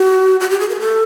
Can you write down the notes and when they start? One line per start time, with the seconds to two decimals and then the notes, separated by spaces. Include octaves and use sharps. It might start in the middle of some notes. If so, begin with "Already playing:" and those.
Already playing: F#4
0.40 F#4
0.50 G4
0.60 G#4
0.69 A#4
0.74 G#4
0.80 A4